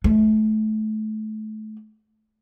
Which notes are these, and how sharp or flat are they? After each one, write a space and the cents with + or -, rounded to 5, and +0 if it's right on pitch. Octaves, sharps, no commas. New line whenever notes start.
A3 -25